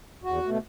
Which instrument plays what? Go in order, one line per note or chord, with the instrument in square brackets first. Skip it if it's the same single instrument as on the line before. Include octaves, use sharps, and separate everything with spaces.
[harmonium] E2 F#4
B2 A3